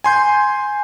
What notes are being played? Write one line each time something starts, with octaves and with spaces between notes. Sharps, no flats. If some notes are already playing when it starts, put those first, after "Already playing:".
G#5 C6 G6